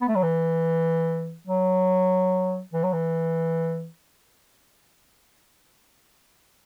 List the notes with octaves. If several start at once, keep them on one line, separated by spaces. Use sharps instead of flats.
B3
A3
F#3
E3
F#3
E3
F#3
E3